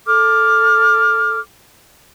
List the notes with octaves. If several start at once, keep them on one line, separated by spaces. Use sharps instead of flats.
A4 D6 F6